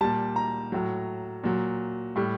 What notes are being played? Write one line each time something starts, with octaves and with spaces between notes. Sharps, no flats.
A#2 G3 A5
A#5
A2 F#3
A#2 F#3
A2 G3